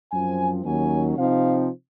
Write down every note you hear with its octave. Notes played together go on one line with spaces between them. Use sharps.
F#2 F3 C4 G#5
D#2 D#3 F#3 C#4 G#5
C3 F3 C4 D#4 F5